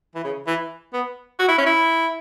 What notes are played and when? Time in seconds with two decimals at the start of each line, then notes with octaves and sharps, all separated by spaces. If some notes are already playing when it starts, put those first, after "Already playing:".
0.15 E3
0.24 C#3
0.47 E3
0.94 B3
1.40 F#4
1.48 E4
1.58 C#4
1.66 E4